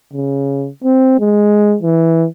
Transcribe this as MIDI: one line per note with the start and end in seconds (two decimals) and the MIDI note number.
0.13 0.68 49
0.84 1.15 60
1.20 1.77 56
1.82 2.27 52